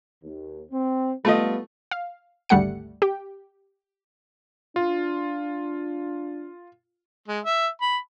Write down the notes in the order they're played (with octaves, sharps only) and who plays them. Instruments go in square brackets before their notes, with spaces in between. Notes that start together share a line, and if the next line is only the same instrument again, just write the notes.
[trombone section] D#2
C4
[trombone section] G3 B3 [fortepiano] A3 F4 D#5
[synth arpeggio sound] F5
G#1 D2 G3 A3 F#5 C#7
G4 G5
[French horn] D4 [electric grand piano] F4
[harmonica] G#3
E5
B5